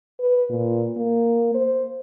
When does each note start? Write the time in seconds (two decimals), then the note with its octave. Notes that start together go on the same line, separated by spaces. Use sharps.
0.20 B4
0.50 A#2
0.97 A#3
1.55 C5